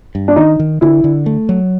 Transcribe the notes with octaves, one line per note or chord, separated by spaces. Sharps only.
G2
D4
D#3 D#4
D#3
D3 E4
D3
A3
F#3